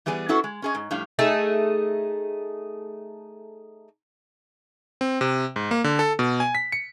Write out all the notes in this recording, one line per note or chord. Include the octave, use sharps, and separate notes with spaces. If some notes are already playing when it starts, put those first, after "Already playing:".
E3 G3 B3 G#4 D5
C#4 D4 E4 F#4 A4 B4
G#3
C#4 G#4 D#5
G#2
A2 F3 G3 D4 F5
A3 D#4 G#4
C4
C3
G#2
A#3
D3
A4
B2
G#5
B6
C#7